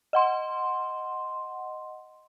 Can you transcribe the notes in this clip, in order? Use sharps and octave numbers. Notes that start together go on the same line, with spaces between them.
D#5 F#5 C6